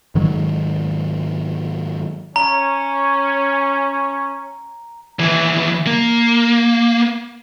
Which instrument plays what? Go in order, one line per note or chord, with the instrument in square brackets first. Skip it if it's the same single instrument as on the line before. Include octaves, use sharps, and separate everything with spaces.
[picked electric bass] G#2 D#3 F#3 G#3
[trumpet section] C#4 [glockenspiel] A#5
[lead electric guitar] D#2 E3
A#3